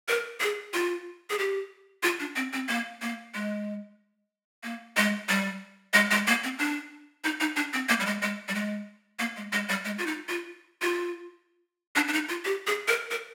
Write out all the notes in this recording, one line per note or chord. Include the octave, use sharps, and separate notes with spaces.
A#4
G#4
F4
G#4
G4
F4
D4
C4
C4
A#3
A#3
G#3
A#3
G#3
G3
G#3
G#3
A#3
C4
D4
D#4
D#4
D4
C4
A#3
G3
G#3
G#3
G3
G#3
A#3
G#3
G#3
G3
G#3
F4
D#4
F4
F4
D4
D4
D#4
F4
G4
G#4
A#4
A#4